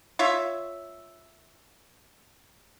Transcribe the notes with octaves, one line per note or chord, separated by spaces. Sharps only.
F4 C#5 E5